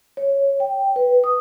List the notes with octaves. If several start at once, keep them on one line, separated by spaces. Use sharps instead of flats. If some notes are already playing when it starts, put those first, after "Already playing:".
C#5
G5
B4
D#6